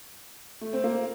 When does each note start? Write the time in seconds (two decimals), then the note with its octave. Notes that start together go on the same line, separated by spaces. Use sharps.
0.61 A3
0.73 C4
0.84 A#3